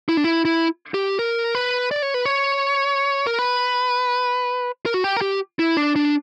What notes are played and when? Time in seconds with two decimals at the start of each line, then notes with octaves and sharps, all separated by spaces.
0.09 E4
0.17 D4
0.24 E4
0.45 E4
0.94 G4
1.19 A#4
1.55 B4
1.91 D5
2.02 C#5
2.14 B4
2.25 C#5
3.27 A#4
3.39 B4
4.86 A#4
4.94 F#4
5.04 G4
5.17 A#4
5.21 G4
5.59 E4
5.77 D4
5.96 D4